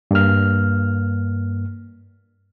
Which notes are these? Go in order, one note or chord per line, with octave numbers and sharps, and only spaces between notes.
G2 A#3 F6